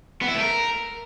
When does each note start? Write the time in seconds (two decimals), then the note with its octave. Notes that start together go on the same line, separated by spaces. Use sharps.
0.22 B3
0.28 E4
0.34 A3
0.41 A#4